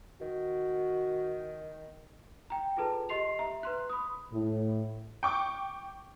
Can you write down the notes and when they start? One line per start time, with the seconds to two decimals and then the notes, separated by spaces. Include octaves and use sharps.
0.21 D#3 F#4
2.50 G5 A#5
2.77 F4 G#4 A4 B4 A5
3.09 G4 D#5 C6 C7 F7
3.39 E5 A#5
3.63 B4 C6 F#6
3.89 B5 D#6
4.32 A2
5.23 G5 C#6 D6